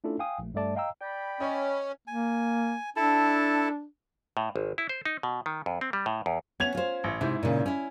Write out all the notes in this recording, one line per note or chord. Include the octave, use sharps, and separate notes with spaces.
A3 C#4 D4 E4 F4 A4
F5 G5 G#5 D#6
A#1 A3
G2 G3 A3 D5 A5
D#5 F5 G5 A#5 E6
D5 G5 B5
C#4 C#5 D#5
A#3 G#5
D4 E4 A4 A5
A2
G#1
E4
C5
D#4
B2
D#3
F2
C4
G3
A2
E2
B3 C#4 G#6 F7
F4 C5
A1
G#2 C3 E4
A#2 C#3
C#4 E4